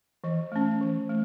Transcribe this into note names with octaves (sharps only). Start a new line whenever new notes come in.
E3 D#5
A3 C#4
E3
A3